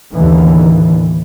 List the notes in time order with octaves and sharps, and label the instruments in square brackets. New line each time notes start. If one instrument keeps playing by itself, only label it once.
[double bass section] D#2 A2 D3 E3